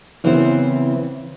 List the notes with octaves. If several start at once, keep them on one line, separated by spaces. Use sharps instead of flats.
C#3 E3 B3 C4 E4 C5